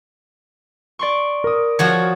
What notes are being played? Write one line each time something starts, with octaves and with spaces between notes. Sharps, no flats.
D5 C6 C#6
A#4 D#6
F3 F#4 C#5